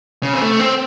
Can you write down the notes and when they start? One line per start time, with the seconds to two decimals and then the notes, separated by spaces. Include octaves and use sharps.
0.23 C#3
0.33 C4
0.41 A3
0.60 C4